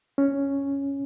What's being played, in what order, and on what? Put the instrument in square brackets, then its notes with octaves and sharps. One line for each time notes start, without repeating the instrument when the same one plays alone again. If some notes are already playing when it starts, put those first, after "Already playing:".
[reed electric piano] C#4